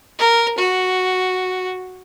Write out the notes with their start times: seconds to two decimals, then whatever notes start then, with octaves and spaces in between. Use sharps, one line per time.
0.19 A#4
0.58 F#4